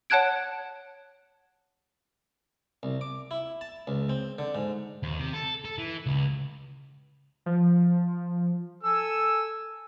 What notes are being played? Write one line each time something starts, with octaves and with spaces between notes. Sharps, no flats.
C#5 F#5 A5 F#6 G#6 D7
C2
D6
E4
A5
C#2
C4
D3
G#2
D#2
C3
A4
A4
E3
C#2
F3
A4 G#5 E6